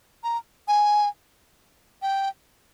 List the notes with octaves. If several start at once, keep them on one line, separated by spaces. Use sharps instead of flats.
A#5
G#5
G5